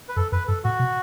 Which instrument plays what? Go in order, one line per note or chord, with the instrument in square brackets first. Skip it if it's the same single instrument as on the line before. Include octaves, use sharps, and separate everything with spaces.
[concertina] B4
[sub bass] F#2 [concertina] A4
[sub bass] F#2 [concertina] B4
[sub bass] G2 [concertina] A4
[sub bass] A2 [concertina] F#4
[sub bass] B2